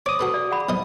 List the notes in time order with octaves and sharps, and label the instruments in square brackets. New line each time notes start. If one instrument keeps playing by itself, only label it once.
[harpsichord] C#5 [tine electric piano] D6 D#6
[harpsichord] F#4 A4 B4
[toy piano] D5
G#4 F#5 B5
[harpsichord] B1 D#5 D#6